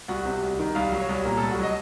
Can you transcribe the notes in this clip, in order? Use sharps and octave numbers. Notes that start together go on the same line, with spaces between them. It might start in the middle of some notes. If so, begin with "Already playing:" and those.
C2 F#4
C3
C2
D#3
C2 F5
F#3
C#5
C2
A#2 A#4
C2 A4
F#4
F#3 D#5